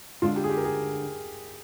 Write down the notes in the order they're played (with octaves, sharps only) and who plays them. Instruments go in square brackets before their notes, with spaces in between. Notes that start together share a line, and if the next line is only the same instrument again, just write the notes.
[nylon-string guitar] D3 G#3 D4 [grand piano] F4
[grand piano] G4
G#4
G4
A#4
G#4